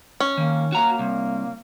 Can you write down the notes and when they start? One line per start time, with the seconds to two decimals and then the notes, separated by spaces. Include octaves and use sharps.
0.20 C#4
0.37 D#3 A#3
0.73 A#3 F#4 A#5
0.99 C2